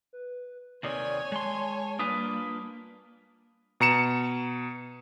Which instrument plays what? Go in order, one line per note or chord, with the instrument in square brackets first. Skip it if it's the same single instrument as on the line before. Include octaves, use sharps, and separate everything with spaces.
[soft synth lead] B4
[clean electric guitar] D#2 C3 D#3 [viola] C#5 G#5 [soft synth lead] D5
[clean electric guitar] G#3 C6 [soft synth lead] A5
[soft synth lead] G3 [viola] A#3 [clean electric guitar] D4 F4 B4 [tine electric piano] D#6
[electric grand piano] B2 A#5 C#7 E7